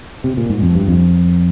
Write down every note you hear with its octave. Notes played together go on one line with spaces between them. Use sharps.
C3
A#2
G#2
F2
G2
F2